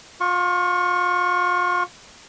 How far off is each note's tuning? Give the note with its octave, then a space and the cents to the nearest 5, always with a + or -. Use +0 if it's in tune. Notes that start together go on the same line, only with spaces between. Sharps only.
F4 +35 C#6 +0